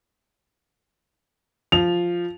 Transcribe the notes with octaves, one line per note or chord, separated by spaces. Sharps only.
F3 F7